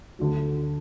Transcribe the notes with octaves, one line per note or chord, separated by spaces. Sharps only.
D2 D3 F#3